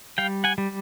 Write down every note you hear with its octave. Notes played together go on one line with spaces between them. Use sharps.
G3 F5 G5
F#5 G#5
G3